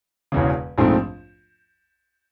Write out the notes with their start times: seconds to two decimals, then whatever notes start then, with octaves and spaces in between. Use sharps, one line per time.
0.32 E1 E2 C#3
0.78 A#1 G#2 F3 A3 C4